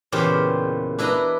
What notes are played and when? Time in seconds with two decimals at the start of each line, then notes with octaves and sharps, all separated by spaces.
0.12 E2 A#2 C#3 G4 C5
0.99 D4 E4 B4 D#5 A#5